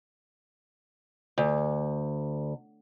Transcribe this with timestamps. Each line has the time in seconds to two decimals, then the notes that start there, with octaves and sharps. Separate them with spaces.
1.38 D2